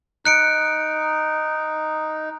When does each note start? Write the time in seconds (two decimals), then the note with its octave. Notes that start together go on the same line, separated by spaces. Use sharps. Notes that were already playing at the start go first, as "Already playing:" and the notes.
0.25 D#4 F#6 C#7 D7